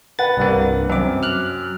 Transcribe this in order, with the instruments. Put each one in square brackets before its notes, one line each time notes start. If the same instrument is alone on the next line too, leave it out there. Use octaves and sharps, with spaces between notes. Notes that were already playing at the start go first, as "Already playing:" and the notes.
[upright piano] B4 F#5 [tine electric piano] A6
[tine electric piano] C2 G2 A#3
[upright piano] F#2 [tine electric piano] C4 D6
[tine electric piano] F6 F#6